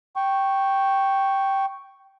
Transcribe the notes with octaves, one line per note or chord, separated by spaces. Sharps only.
G5 C#6